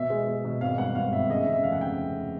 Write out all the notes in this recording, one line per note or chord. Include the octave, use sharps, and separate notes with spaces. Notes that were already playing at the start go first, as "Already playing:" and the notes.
Already playing: B2 E5
G#3
G#3
B2
G#1 F5
G2 F#5
G#1 F5
G#1 E5
C#3 D#5
E5
C#3
E5
F1 F5
F#5
C#3 G5